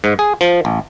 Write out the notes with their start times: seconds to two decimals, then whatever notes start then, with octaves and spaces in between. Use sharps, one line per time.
0.04 G#2
0.19 G#4
0.41 F3
0.65 A1